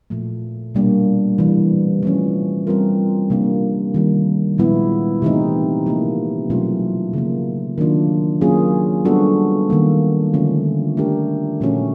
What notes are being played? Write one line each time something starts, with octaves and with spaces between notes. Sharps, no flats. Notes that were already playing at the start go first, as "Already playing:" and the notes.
A#2 F3 A3
B2 G3 A#3 D4
C3 E3 G3
F3 A3 C#4
G3 C4 F4 A#4
C3 F3 A#3 D4
D#3 G3 A#3
A#2 F3 G#3 B3 E4
C3 E3 A3 C4 D#4
C3 F3 A#3 D#4
B2 F#3 A3 C#4 F4
C#3 F3 A#3
D#3 F#3 A#3 D4 F4
F#3 A#3 C#4 F4 G#4
G3 B3 D4 F#4 A4
D#3 G3 A#3
D3 F3 A3 C#4 F4
A3 D4 G4 A#4
A#2 F3 A3 C#4 F#4